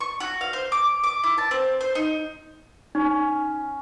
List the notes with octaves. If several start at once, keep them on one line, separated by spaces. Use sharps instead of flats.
C#6
F#4
F5
C5
D6
D6
E4
A5
C4
C5
D#4
C#4 D#4